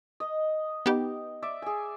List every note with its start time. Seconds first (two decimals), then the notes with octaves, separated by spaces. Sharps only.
0.20 D#5
0.86 B3 D#4 G4
1.42 D5 E5
1.62 G#4 G#5